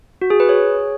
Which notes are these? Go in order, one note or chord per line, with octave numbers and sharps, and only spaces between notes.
F#4
G#4
B4
G#4 C#5